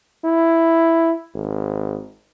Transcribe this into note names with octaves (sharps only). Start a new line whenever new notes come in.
E4
G#1